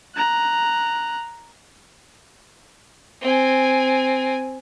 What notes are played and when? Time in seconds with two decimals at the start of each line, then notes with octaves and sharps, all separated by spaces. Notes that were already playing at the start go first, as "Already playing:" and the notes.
0.16 A#5 F#6
3.22 C4 G#5